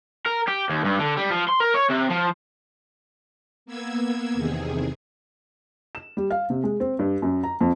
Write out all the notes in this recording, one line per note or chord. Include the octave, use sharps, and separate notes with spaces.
A#4
G4
D#2
G2
D3
G3
F3
C6
A#4
C#5
C3
F3
A#3 B3 E6 G#6
E2 C3 D#3 G#4
E7
G3
F5
C3
G#3
C4
G2
F#2
A#5
F2